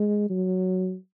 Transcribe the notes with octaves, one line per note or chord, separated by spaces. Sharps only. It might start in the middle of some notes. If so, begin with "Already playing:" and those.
Already playing: G#3
F#3